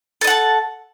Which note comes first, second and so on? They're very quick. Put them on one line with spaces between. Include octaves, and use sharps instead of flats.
A4 D#5 F#5 A5